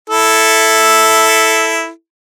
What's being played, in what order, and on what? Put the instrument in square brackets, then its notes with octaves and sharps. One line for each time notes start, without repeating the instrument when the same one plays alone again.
[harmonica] E4 A4